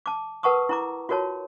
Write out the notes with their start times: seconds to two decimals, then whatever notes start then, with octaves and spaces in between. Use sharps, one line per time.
0.06 A5 D6
0.43 A#4 B4 F#5 A5 C#6 D#6
0.69 E4 A#5 D6
1.09 F4 F#4 A#4 C#5 A5